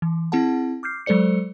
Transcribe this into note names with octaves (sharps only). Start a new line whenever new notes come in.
E3
C4 E4 G#4 F#5 A5
D6 F6 G6 C7
F#3 G#3 A4 C5 D5 C#7